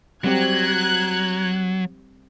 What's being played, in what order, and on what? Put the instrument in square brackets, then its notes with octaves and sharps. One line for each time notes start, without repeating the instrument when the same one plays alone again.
[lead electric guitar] F#3 [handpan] G3 C4 G4 [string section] F#6 G#6